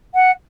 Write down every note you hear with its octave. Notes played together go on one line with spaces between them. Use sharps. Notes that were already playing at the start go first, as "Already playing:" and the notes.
F#5